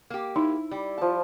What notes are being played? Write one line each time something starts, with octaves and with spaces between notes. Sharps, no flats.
A#3 G4
D#4 E4
G3
F3 A5